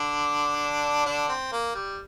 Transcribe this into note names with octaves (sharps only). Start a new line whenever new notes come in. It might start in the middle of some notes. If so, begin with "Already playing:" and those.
Already playing: D3 D4
D3 D4
C4
A#3
G3